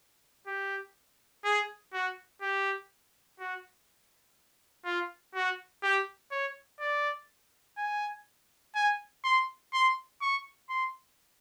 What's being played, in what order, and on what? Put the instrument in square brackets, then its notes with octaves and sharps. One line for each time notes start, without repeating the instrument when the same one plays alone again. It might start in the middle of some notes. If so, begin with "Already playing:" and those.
[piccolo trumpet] G4
G#4
F#4
G4
F#4
F4
F#4
G4
C#5
D5
G#5
G#5
C6
C6
C#6
C6